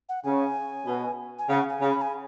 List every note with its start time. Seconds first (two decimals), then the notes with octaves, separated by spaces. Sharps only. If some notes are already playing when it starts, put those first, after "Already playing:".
0.09 F#5
0.24 C#3 G#5
0.86 B2
1.39 G#5
1.49 C#3 F#5
1.69 G#5
1.81 C#3
1.90 B5
2.02 G#5